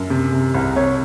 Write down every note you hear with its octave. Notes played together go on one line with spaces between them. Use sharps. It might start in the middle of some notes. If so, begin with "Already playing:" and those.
Already playing: F#2
C3
C3
C2
C3 C#5